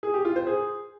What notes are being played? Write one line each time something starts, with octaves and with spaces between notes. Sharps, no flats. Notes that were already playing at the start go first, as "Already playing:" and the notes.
G#4
G4
F4
C5
G#4